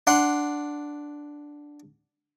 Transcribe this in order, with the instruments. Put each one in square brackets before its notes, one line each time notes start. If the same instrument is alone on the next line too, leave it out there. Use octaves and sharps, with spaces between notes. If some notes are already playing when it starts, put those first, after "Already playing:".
[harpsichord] D4 F#5 C6